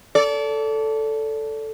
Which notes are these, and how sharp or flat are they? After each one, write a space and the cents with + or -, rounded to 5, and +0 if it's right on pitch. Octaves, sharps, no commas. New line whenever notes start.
A4 +0 D5 -30